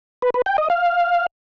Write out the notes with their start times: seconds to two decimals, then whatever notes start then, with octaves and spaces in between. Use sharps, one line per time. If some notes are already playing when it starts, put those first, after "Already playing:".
0.22 B4
0.34 B4
0.46 G5
0.58 D#5
0.70 F5